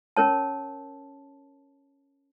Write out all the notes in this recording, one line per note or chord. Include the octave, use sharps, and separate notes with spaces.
C#4 A#4 C#5 A5